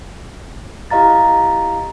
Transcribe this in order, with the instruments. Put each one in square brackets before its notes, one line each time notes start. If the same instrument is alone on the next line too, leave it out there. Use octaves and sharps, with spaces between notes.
[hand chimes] E4 G4 D#5 F5 A#5 A6